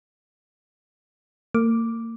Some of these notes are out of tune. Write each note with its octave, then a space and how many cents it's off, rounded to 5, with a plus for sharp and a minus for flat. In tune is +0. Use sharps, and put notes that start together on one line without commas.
A#3 -35 D6 +0